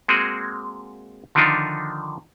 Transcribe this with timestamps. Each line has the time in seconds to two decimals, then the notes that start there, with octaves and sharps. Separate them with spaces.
0.08 G#3 A#3 C4 F#4 G#4
1.35 D3 D#3 F3 D4 D#4 F4